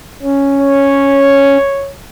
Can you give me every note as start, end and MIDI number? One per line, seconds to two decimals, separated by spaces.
0.23 1.58 61
0.60 1.92 73